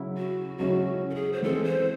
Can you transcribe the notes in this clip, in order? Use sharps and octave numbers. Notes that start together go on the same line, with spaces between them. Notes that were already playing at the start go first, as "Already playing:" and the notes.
Already playing: C#3 F#3 C#4 E4
F#4
C#3 F#3 C#4 E4 F#4
A4
G#4
C5
E3 G#3 C4 A4
C5